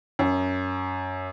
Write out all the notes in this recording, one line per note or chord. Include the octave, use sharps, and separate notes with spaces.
F#2